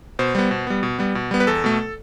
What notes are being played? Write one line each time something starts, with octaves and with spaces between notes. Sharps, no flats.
B2 C5
G3 B3
B2
G3 B3
B2
G3 B3
B2
G3 B3
B4
E2 A4
B2 A3